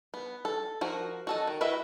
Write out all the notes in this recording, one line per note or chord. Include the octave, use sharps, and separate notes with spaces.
B3
A4
F3 F#4 A#4
F#4 A4 D#5
D#3
E4 F#4 B4 D#5 E5